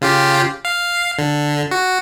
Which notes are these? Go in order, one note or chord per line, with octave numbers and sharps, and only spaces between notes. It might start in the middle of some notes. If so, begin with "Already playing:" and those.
C#3 F4 G4
F5
D3
F#4